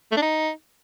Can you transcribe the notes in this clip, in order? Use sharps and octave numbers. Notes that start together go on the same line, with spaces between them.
A3
D4
D#4